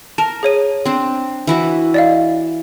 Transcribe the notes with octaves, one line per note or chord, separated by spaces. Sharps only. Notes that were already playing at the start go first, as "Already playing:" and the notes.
A#4 A5
G#4 C#5 D#7
C4 D4
E3 E4 F#4
D5 D#5 F5